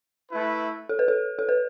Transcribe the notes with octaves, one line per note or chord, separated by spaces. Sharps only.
A3 E4 B4
A4
B4
A4
A4
B4